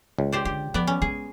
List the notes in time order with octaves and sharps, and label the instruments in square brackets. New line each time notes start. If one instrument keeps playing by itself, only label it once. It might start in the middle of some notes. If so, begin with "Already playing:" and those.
[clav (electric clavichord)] C#2
[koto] G4 C5 D5
[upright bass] D3 [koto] G4
[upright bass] F3 [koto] B3 D5
[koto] C#4
[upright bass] G#3 [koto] G#4